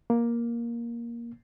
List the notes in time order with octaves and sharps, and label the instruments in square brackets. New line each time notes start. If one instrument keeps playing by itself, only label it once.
[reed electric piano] A#3